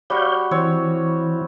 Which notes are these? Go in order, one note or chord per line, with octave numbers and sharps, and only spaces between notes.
G3 F#4 C#5 F5 G6
E3 C4 C#5